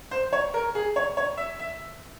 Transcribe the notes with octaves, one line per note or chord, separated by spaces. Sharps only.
C5
C#5
A#4
G#4
C#5
C#5
E5
E5